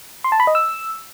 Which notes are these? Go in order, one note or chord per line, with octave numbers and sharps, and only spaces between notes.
C6
A5
B5
D#5
E6